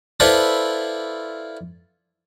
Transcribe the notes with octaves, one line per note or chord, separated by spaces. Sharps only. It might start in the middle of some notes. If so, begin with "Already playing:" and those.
E4 F4 A4 B4 C5 D5